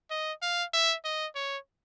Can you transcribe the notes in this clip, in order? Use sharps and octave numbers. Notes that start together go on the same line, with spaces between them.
D#5
F5
E5
D#5
C#5